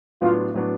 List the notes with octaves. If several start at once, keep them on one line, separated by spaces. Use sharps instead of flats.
A2 F#3 B3 D4 F4
A2 F#3 B3 D4